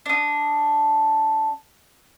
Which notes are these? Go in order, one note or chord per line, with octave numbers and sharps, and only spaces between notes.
D4 D#6